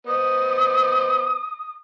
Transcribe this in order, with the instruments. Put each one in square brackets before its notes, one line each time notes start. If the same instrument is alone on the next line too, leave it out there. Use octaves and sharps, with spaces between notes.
[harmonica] B3 C5 D#5 [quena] D#6